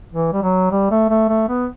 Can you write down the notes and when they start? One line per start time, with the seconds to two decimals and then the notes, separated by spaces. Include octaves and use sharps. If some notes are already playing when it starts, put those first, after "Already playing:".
0.14 E3
0.33 G3
0.43 F#3
0.71 G3
0.91 A3
1.09 A3
1.29 A3
1.48 B3